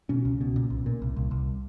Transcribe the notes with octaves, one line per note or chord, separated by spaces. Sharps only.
B2 C#4
C#2
B2
A#2
B1
A#2
C2
C2
C2